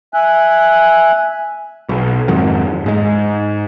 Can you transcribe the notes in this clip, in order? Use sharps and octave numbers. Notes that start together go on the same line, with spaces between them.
E5 G#5 F#6
B1
F2 G#2 D#3 F#3
G#2 G#3